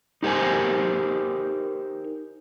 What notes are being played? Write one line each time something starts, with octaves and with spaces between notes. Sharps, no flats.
D#4 G4 A#4 C5 G#5